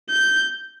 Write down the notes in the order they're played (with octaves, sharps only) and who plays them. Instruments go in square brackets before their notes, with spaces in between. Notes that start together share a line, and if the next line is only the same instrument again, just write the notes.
[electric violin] G6